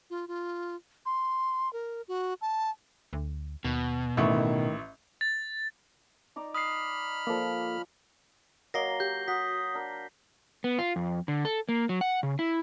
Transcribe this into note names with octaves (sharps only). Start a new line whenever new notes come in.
F4
F4
C6
A#4
F#4
A5
D2
D#2 B2
A1 D#3 A3 E4 C#6
A6
D#4 D5 A#5
B5 D#6 F6 C7
F3 A#3 A4 D5
F#3 A#3 A#4 D#5 D6 A#6 C7 G7
G4 G6
F#4 F#5 D#6 B6
D4 A#4
B3
F4
F2
D3
A4
A#3
F#3
F#5
C#3
E4